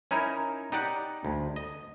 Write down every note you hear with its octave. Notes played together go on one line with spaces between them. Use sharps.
C#4 D#4 E4 A#4
D#4 G4 D5 F#5
D2
D#5